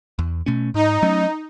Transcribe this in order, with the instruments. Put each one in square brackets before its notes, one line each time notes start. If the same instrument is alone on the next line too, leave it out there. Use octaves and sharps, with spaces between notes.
[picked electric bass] E2
B2 A3 C#4
[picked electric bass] G#2 [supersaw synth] D#4
[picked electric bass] F#3 A3 C#4